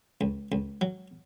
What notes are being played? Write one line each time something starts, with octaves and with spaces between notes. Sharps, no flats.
C#2
C#2
F#3